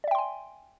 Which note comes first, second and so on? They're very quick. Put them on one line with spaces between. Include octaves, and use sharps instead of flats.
D5 E5 G5 C6 G#5